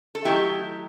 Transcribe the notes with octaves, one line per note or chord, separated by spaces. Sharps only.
A4
D#3 F#3 A3 E4 G4